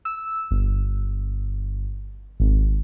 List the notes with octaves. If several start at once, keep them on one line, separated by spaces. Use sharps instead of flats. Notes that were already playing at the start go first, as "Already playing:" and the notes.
E6
G1
G#1